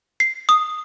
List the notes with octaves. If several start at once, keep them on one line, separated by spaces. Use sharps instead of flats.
C7
D#6